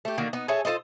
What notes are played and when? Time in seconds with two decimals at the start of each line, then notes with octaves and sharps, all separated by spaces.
0.05 A3 G4
0.18 D3 D#3 A#3 F#4
0.33 B3 D#4
0.48 G#4 A4 C#5 E5
0.65 F4 A4 C5 D#5